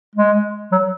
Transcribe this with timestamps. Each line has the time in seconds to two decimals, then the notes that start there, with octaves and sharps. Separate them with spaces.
0.15 G#3
0.72 F#3